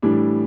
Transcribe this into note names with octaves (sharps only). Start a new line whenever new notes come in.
A2 E3 G3 D4